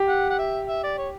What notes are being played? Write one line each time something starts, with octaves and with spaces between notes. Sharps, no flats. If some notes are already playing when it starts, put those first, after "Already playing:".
Already playing: G4
F#5
F#5
E5
E5
D5
C#5